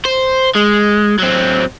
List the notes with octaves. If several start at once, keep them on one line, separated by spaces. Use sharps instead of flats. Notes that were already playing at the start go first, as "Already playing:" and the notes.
C5
G#3
F#3 C4